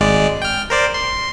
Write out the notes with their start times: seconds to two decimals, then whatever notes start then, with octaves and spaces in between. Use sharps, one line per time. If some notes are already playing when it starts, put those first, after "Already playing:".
0.01 G#1 G#3 D5
0.42 G5 F6
0.70 A#4 C5 D5
0.94 C6